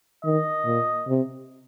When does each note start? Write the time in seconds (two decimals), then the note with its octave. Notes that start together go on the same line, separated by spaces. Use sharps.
0.25 D#3 D#5
0.65 A#2
1.08 C3